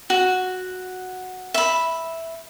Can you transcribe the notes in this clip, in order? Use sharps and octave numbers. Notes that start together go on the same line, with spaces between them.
F#4
E5 B5